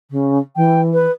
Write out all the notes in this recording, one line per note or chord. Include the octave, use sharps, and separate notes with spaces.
C#3
E3 G5
B4